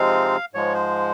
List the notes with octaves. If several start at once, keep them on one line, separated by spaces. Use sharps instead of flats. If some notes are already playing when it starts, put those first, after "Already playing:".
Already playing: C3 F3 G#3 C4 D#4 F5
G#2 F3 G#3 C#5
C5